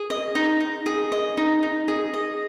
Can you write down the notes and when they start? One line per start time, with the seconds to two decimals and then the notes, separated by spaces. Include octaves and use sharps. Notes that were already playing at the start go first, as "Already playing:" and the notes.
Already playing: G#4
0.10 D#5
0.35 D#4
0.60 D#4
0.86 G#4
1.12 D#5
1.37 D#4
1.63 D#4
1.88 G#4
2.14 D#5